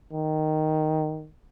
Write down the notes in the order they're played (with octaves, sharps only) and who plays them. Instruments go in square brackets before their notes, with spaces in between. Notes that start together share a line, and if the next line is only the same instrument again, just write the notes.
[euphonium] D#3